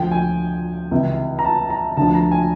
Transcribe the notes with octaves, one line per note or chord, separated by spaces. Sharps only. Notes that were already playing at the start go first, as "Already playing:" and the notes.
Already playing: D2 D3 F3 G5
G#5
C#2 C3 E3
A#5
A5
A#5
D2 D3 F3 A5
A#5
G#5